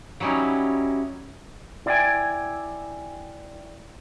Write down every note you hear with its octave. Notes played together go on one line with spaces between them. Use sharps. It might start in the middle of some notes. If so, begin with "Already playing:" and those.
F#3 G3 C#4 D#4 E4
E4 D5 E5 F5 G5 G#5